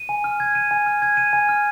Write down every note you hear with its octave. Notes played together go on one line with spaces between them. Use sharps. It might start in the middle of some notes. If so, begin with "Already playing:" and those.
Already playing: D#7
G#5
F6
G#6
D#7
G#5
F6
G#6
D#7
G#5
F6